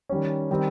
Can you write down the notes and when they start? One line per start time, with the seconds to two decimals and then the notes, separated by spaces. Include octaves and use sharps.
0.09 D#3 G3 C#4
0.50 D#3 G3 C4